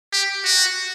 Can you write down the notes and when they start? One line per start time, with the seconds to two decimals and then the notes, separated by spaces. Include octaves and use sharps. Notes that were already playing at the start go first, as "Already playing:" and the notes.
0.13 G4
0.45 F#4